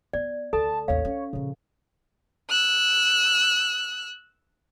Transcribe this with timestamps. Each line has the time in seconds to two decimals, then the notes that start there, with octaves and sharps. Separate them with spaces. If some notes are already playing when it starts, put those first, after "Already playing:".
0.13 B3 D5
0.53 D2 A4 A5
0.88 A1 D#2 C#5 F5
1.05 C#4
1.33 A#2 C#3 F3
2.50 E6 F#6